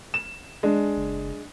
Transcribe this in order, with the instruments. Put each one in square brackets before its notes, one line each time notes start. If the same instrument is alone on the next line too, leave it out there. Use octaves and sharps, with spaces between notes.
[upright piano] E7
G#3 D4
[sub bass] F#1